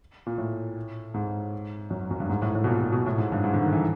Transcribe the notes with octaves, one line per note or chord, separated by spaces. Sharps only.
A#2
A2
G#2
F#2
F#2
G2
G#2
A2
A2
B2
A#2
B2
B2
A2
G#2
G2
G#2
D3
D#3
E3